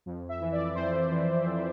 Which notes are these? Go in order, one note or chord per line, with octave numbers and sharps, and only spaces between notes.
F2
E5
E3
D5
F2 C5
E3
F2